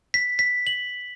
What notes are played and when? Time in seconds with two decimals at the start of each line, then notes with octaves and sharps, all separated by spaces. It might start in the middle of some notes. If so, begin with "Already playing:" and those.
0.14 B6
0.39 B6
0.67 F#7